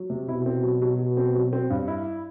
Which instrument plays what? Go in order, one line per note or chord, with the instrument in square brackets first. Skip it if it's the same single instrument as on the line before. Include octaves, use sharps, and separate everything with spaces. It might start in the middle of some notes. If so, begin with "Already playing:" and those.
Already playing: [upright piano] F#3
C3
[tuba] B2 [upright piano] E4
[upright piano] C4
F#3
F#3
F#3
C4
F#3
C4
G2
E4